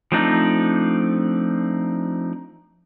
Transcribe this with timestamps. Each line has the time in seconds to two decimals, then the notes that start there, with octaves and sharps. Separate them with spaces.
0.12 F3 A3 C4 D4 D#4